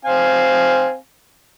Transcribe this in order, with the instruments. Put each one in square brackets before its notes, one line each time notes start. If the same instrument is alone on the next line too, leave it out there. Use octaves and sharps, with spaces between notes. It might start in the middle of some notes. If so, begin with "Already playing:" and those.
[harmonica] C4 F5 G#5